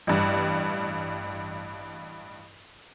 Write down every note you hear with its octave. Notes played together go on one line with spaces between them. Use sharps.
A1 G2